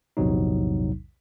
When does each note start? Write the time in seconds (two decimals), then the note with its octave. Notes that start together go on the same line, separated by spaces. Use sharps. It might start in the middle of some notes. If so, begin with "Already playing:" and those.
0.17 A#1 E2 G#2 C3 F#3 D#4